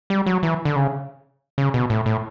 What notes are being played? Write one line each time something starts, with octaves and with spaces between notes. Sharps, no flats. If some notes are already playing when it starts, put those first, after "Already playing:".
G3
F#3
E3
D3
C#3
C#3
B2
A2
A2